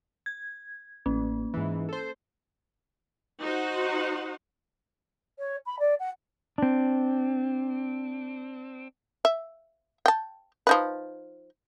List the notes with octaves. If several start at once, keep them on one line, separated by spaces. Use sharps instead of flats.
G#6
A1 A#3 C#4
G#2 E3
A4 C5
D#4 F#4 C5 F#5
C#5
B5
D5
F#5
C4 D4
E5
G5 A5
F3 D#4 B4